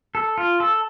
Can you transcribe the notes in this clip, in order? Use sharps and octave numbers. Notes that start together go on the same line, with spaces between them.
A4
F4
A4